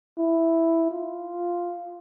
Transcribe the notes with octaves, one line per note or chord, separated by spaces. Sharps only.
E4
F4